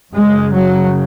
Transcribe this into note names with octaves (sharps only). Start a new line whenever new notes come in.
F#2 C#3 G#3
F#3